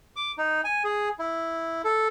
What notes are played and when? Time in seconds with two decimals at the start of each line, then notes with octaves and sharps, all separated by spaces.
0.16 D6
0.38 D#4
0.64 G#5
0.84 G#4
1.19 E4
1.84 A4